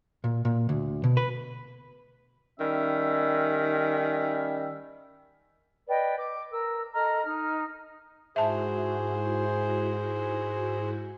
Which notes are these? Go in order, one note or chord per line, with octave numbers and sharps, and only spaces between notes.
A#2
A#2
D2
B2
B4
D#3 G3 C#4 E5
B4 D5 D#5 G5
D6
A#4 E6
A4 D#5 A#5 F6
D#4 F6
G#2 E4 F#4 G#4 C5 E5 A5